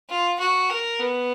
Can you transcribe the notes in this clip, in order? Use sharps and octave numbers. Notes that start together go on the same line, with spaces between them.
F4
F#4
A#4
B3